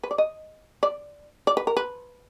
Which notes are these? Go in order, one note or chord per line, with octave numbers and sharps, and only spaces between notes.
B4
D5
D#5
D5
D5
B4
A#4
B4